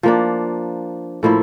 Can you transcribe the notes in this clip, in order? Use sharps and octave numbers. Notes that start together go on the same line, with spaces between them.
F3 A#3 D4
A2 F3 A#3 E4